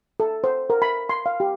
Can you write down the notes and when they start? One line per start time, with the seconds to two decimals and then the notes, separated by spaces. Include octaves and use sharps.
0.20 A4
0.44 C5
0.70 A#4
0.82 B5
1.09 C6
1.26 F5
1.40 G4